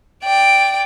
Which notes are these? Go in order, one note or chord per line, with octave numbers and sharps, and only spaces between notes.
D5 G5